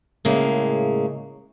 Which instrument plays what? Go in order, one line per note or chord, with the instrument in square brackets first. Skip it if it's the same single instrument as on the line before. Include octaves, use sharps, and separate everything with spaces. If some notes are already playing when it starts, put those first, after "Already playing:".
[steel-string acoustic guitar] A2 C#3 G#3 A#3